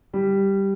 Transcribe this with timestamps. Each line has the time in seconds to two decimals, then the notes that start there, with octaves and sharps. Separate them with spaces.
0.14 G3